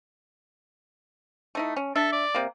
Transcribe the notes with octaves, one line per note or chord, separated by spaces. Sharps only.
A3 D#4 E4
C#4
D4 A4 E5
D5
C3 A#3